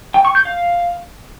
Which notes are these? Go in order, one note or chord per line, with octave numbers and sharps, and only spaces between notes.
G5
C#6
G6
F5